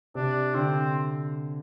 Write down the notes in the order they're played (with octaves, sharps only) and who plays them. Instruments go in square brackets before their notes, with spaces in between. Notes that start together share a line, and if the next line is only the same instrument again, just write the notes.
[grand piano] C3 [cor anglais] D4
[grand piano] D3 [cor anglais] C4